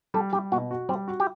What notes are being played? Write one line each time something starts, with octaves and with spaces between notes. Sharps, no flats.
G3 A4
G3 G4
B2 F#4
F#4
G3 C4
F#4
G4